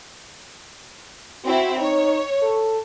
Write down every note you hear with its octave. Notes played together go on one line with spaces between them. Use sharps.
C4 E4 F#4
D#4 C#5
A4